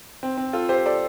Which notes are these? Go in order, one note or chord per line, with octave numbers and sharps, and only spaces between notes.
C4
C4
F4 A4
G4 C5
A4 D5